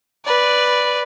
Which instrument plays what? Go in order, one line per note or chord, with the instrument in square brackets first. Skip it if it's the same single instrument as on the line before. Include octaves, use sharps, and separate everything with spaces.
[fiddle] B4 D5